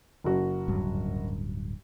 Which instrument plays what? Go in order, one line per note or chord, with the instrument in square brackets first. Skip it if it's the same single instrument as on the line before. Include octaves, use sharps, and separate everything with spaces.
[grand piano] F#1 F#4
[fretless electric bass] D1 G2 F#3